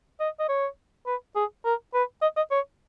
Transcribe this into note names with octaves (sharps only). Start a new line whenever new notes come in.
D#5
D#5
C#5
B4
G#4
A#4
B4
D#5
D#5
C#5